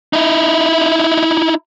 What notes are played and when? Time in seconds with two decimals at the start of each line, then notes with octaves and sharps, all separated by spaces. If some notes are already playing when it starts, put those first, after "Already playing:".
0.13 D#4 E4